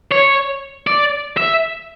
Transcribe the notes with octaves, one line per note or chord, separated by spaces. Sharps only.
C#5
D5
E5